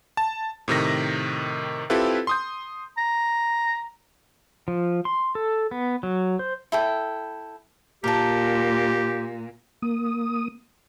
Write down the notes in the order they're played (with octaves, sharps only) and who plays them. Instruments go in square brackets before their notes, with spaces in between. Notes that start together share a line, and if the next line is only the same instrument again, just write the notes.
[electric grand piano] A5
A2 C3 D#3 A#6
C4 E4 F4 G4 A4 B4
C6 D#6 G6
[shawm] A#5
[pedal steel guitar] F3
C6
A4
B3
F#3
C5
[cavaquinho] E4 A4 G5
[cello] A#2 [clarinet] G4 [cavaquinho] A#4 A5
[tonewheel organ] A#3 D#6